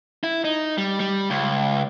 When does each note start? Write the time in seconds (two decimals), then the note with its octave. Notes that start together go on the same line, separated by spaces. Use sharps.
0.24 E4
0.44 D#4
0.78 G3
1.00 G3
1.30 C#2